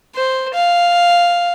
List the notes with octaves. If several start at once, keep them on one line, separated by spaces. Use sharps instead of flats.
C5
F5